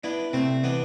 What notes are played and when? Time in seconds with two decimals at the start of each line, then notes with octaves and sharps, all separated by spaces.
0.04 B3 D4 E4
0.33 C3 A3 C4
0.64 E3 B3 D4